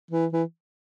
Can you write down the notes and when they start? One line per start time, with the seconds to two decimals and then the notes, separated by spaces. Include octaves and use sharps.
0.11 E3
0.33 E3